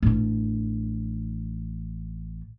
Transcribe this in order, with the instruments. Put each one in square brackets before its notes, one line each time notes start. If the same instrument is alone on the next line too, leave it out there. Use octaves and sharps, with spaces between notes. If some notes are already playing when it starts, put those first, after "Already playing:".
[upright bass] A1 D4